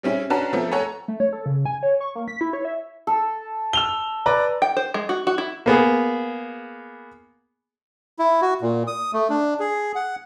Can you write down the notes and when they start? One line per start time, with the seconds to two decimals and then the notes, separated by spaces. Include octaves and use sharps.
0.03 G3 C4 C#4 E4 G#4
0.30 C#4 D4 F#4 B4 A5 A#5
0.53 F3 A3 B3 C4 A4
0.72 A4 C#5 F#5 G#5 A#5
1.08 A3
1.20 C#5
1.33 A4
1.46 C#3
1.66 G#5
1.83 C#5
2.01 C#6
2.15 A#3
2.28 B6
2.41 E4
2.53 C#5
2.65 E5
3.07 A4
3.73 E6 F7 G7
4.26 B4 D5 A#5
4.62 G5
4.77 C5
4.94 G#3
5.09 F#4
5.27 F#4
5.38 E4
5.66 A#3 B3 G#4
8.19 E4
8.42 F#4
8.62 A#2
8.87 D#6
9.13 A3
9.30 D4
9.60 G#4
9.95 F#5